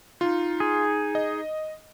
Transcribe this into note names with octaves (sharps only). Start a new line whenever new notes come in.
D#4 F4
G#4
D#5